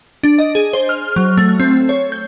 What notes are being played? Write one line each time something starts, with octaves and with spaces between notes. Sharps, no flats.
D4
D#5
G#4
C5
F6
F#3
A3
C4
C#5
G6